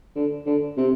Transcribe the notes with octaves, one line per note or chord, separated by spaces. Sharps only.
D3
D3
C3